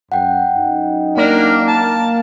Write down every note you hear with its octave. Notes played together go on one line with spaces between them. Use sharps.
F#2 F#5 G5
F#2 D#4
A#3 D4 A#4
A5